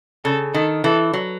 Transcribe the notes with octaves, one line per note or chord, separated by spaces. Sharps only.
C#3 A4
D#3 A4
E3 A4
F#3